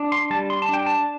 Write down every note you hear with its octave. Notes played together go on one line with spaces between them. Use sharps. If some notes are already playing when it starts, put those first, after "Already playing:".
Already playing: D4
C6
G3 A5
C6
A5
D4 G5
A5